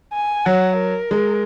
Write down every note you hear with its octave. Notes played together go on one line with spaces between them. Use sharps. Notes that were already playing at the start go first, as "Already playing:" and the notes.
G#5
F#3 F#5
A#4
G#3